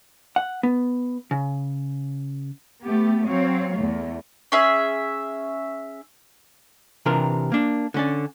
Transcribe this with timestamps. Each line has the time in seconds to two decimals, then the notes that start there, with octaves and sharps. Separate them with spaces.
0.36 F#5
0.63 B3
1.31 C#3
2.84 A3 B3 G4
3.27 F#3 C4 C#5 F5
3.76 E2 A3
4.52 C#4 G#4 E5
7.06 C3 E3 D4 F4 G4 A#4
7.52 A#3 D4
7.94 D3 C#4 D5